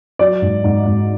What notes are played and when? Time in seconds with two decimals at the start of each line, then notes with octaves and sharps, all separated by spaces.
0.19 F#3 D5
0.42 G#2
0.64 G#2
0.86 G#2